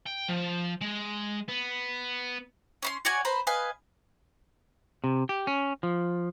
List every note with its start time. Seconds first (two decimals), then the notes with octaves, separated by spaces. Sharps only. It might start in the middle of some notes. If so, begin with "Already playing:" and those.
0.06 G5
0.28 F3
0.81 G#3
1.48 B3
2.82 C#4 B5 C6
3.05 F#4 C#5 D5 G#5
3.25 B4 C5 A#5 B5
3.47 B4 D#5 F5 G#5
5.04 C3
5.29 G4
5.47 C#4
5.83 F3